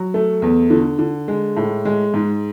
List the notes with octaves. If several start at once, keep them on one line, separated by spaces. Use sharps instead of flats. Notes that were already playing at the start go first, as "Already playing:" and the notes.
Already playing: F#3
A3
E2
D3
D3
G#3
A2
G#3
G#2